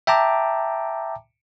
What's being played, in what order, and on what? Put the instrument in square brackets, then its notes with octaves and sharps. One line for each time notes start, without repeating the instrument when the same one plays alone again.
[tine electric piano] E5 G5 A5 A#5 D6